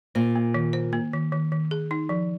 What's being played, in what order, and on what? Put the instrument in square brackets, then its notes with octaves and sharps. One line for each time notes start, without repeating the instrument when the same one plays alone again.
[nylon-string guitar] A#2 [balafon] C5
[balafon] A#3
D#3
C5
A#3
D#3
D#3
D#3
G#4
D#4
F3